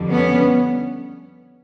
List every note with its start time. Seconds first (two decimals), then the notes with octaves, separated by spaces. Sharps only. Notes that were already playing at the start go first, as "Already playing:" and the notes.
Already playing: F2 D3 G3
0.09 B3 C#4